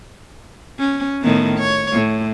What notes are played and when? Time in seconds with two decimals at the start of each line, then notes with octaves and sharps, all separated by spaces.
0.79 C#4
1.22 A2 D#3 B3
1.59 C#5
1.92 A2